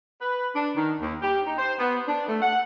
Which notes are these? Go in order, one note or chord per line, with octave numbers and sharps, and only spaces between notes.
B4
D4
D#3
D#2
G4
D#4
C5
B3
D4
A3
F#5